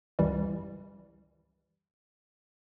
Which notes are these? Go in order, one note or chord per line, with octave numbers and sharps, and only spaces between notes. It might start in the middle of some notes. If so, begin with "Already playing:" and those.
G#1 C#2 F#2 E3 G3